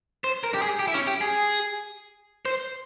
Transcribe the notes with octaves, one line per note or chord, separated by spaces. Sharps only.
C5
A#4
G4
G#4
G4
E4
C#4
G4
G#4
C5